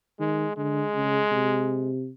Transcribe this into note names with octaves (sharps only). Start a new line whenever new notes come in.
D#3 G#3
D3 G#3
C#3
C3